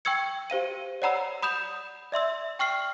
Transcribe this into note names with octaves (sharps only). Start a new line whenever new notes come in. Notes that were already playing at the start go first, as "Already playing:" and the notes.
G5 C#6 E6 G#6 C#7
G4 C5 F5 D#7
C#5 D5 F#5 A#5 B5 E6
B5 D#6 G6 E7 F7
D5 E5 C6 E6
G5 C#6 F6 C7